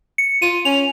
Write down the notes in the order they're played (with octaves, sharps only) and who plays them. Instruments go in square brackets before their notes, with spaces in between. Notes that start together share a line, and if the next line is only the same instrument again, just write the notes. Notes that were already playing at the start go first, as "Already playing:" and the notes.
[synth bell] C#7
[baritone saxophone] F4 [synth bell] D#7
[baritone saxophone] C#4 [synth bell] F7